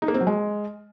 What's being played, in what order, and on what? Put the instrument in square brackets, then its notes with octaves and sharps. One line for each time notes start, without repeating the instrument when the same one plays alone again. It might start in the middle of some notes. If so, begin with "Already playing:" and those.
[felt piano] D#4
A#3
C4
F#3
G#3